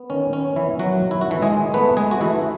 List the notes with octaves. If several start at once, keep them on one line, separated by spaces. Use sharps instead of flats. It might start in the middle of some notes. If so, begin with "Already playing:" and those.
Already playing: B3
D#3 C#4
B3 C#4
E3 B3 E4
D#3 F#3 F#4
D#3
E4
F#4
E3 A3 E4
G#3 G#4
D#3
A3 B3 B4
G#3 A3 G#4
F#4
E3 A3 E4